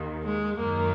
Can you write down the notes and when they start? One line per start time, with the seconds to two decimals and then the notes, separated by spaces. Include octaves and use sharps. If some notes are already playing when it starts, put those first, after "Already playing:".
Already playing: D#2 D#3
0.23 G#3
0.59 F#2 D#3 A#3